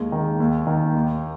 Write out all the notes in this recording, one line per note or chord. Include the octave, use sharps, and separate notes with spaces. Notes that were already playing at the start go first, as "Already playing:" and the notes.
Already playing: D#2 G#3
D#3
D#2
D#3
D#2